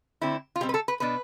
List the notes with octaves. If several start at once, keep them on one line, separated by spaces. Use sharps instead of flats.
D3 A3 C4 E4
F4
B2 G3 C4 G4
B4
A4
B4
B2 B3 D4 B4